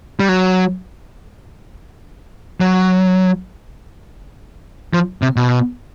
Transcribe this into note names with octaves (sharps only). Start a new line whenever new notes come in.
G3
F#3
F#3
F3
C3
B2